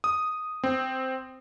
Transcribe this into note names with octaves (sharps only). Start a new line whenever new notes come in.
D#6
C4